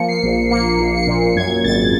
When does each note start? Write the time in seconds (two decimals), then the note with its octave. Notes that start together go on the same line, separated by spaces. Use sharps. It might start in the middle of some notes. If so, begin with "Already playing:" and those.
Already playing: F3 A#3 C#7
0.08 C7
0.23 A#1
0.50 A#3 C#7
0.79 A#1
0.94 C#7
1.07 A#2
1.36 F#2 G#6
1.64 G#1 A6